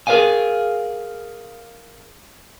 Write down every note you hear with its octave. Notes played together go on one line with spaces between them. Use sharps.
G#4 A#4 B4 D#5 F5 G#5